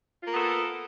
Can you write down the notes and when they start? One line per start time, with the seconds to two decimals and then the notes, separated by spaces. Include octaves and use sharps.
0.23 F4
0.27 A#3
0.32 B3
0.36 A4